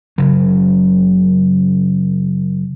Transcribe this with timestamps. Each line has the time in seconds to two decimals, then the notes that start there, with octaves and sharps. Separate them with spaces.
0.18 F#1 C#3 F#3